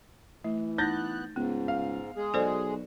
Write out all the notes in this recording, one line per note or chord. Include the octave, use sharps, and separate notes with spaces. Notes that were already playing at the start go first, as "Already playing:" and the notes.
E3 A3
B3 D#4 F#6 G6 A6 A#6
C#2 G#2 B3
F5
G#3 G#4
B1 F#4 A4 C5 D5